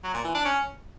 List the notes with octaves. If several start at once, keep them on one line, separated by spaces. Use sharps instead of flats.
F#3
A#2
E3
D4
C#4